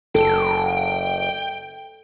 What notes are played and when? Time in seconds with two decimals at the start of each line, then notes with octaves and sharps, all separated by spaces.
0.15 F#1 A4 G5